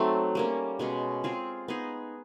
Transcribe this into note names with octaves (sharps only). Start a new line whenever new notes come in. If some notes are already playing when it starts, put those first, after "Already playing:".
Already playing: F#3 A3 C4 D#4
G3 A#3 C#4
B2 G#3 C#4
C4 F4 G#4
B3 D#4 G#4